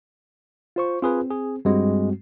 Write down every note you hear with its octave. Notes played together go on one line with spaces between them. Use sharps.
F4 C5 C#6
C4 F4 G#4 B4
G#4
G2 G3 G#3 C4 F#4